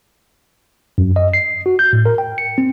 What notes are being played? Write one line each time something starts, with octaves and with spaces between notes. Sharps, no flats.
F#2
D#5
C7
F#4
G6
A2
A#4
G5
C#7
C4